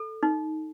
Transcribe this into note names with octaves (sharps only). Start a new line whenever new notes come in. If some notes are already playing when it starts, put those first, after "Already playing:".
Already playing: A4
D#4